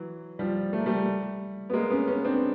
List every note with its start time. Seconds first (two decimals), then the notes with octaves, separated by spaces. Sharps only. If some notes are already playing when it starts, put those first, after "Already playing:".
Already playing: E3 F#3
0.39 F3 G3
0.73 A3
0.79 A#3
0.86 G3 A3
1.70 B3
1.73 G#3 A#3
1.90 B3 C#4
2.07 B3 C#4
2.25 C4 D4